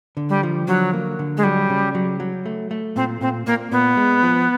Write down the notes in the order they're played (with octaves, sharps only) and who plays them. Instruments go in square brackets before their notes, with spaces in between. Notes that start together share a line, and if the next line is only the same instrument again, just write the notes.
[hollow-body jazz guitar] D3
[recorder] G3
[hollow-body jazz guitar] F3
[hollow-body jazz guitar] D3 [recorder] F#3
[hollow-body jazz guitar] A#3
D3
[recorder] G#3
[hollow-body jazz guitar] F#3 [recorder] G3
[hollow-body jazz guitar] C#3
F#3
F#3
A3
A3
[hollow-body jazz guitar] A#2 [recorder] C4
[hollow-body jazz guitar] A#2 [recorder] C4
[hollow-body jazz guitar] A#2 [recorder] A#3
[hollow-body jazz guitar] A#2 [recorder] B3
[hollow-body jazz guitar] G#3
F3